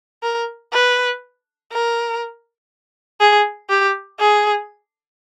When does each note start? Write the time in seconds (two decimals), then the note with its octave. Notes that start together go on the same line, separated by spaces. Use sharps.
0.23 A#4
0.73 B4
1.72 A#4
3.20 G#4
3.70 G4
4.20 G#4